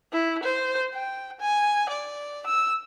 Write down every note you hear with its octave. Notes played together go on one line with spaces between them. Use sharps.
E4
C5
G5
G#5
D5
E6